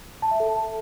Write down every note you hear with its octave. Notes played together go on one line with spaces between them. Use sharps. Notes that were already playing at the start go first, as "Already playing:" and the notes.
A5
E5
A4